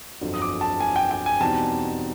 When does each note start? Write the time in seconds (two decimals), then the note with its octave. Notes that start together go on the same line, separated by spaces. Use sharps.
0.21 G1 F2 D3 F#3
0.34 D#6
0.42 D6
0.61 A5
0.80 G#5
0.96 G5
1.11 G5
1.26 G#5
1.40 E2 B2 G3 C4 D#4 A5